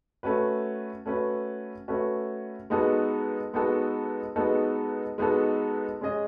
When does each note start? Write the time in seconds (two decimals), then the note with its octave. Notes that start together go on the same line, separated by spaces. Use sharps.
0.23 A3 C#4 F#4 B4
1.06 A3 C#4 F#4 B4
1.88 A3 C#4 F#4 B4
2.70 G#3 B3 D#4 F#4 A4
3.53 G#3 B3 D#4 F#4 A4
4.36 G#3 B3 D#4 F#4 A4
5.18 G#3 B3 D#4 F#4 A4
6.01 G#3 C#4 G#4 D#5